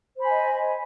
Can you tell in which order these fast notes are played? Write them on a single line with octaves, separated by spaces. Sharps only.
C5 B5 G#5 D#5